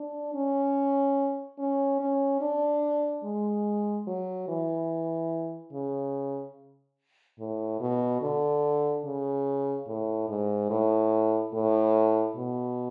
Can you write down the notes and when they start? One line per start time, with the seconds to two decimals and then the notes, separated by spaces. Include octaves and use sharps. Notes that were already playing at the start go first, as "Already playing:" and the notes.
Already playing: D4
0.34 C#4
1.58 C#4
2.00 C#4
2.41 D4
3.24 G#3
4.07 F#3
4.48 E3
5.73 C#3
7.39 A2
7.81 B2
8.22 D3
9.05 C#3
9.88 A2
10.29 G#2
10.70 A2
11.53 A2
12.36 B2